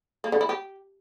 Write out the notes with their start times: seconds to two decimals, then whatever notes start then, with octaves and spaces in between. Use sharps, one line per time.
0.24 A#3
0.32 D3
0.41 E4
0.49 G4